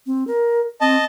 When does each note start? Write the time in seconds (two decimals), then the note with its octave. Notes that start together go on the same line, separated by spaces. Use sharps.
0.07 C4
0.27 A#4
0.81 C4 D#5 A5